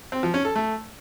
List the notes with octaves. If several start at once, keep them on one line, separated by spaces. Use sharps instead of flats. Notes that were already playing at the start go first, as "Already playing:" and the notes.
C4
F3
C#4
A4
A3